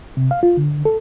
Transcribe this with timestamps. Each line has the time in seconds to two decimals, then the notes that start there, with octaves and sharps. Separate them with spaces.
0.17 C3
0.31 F5
0.43 F4
0.57 D3
0.85 A4